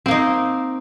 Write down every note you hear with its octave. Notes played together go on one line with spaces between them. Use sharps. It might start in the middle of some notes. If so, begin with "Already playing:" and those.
A#3 C4 D#4